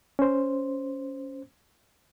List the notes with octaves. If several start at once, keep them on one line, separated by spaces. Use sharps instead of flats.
C#4 C5